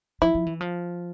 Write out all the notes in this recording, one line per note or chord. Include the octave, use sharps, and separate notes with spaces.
F3 E4
F3
E3
F3